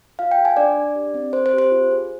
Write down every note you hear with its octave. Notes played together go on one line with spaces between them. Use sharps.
F4 F5
G5
G#4
G#5
D4 D5
D4
G4
C4
C4 C5
C5
G4
C5
F4
G#4